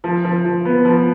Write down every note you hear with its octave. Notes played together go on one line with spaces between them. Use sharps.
F3
F3
F3
B3
F3